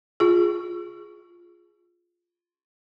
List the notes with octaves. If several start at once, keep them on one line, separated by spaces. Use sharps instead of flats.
F4 G#4